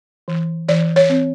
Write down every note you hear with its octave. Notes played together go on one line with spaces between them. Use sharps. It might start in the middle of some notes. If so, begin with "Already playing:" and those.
E3
E3 D5
C#5
C4